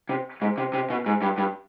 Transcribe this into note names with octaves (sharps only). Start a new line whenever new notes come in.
C3
G#2
C3
C3
B2
G#2
G2
G2